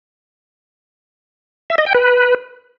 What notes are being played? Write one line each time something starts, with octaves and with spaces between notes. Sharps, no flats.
E5
D#5
G5
B4